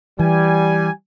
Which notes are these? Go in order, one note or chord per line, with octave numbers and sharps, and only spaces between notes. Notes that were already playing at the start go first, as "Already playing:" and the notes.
E3 G3 G#5